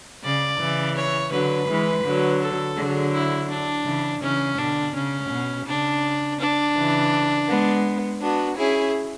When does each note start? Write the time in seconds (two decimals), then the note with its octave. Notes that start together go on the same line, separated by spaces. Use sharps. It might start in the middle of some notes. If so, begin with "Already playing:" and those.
0.23 C#3 D5
0.59 C#3 E3
0.96 C#5
1.32 D3 F#3 B4
1.69 E3 G#3
2.04 D3 F#3
2.41 A4
2.77 D3 F#3 G#4
3.13 E4
3.50 D4
3.85 C#3 E3
4.22 C#3 E3 C#4
4.58 B2 D3 D4
4.95 C#3 C#4
5.31 B2
5.67 C#3 D4
6.40 D4
6.76 C#3 E3
7.48 G#3 B3
8.21 B3 D4 F#4
8.57 C#4 E4 G#4